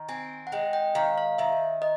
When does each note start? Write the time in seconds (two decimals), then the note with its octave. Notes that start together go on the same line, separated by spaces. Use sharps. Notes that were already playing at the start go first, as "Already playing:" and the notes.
Already playing: D#3
0.09 C4 G#5
0.47 F#5
0.52 G#3 G5
0.73 G5
0.95 D#3 F5
1.18 F5
1.38 D#3 E5
1.82 D#5